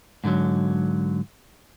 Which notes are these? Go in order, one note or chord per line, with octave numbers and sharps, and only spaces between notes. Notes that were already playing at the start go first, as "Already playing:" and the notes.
G#2 D3 E3 F#3